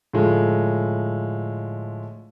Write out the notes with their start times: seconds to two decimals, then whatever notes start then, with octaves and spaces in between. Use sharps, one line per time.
0.13 A2 D3 F3 G#3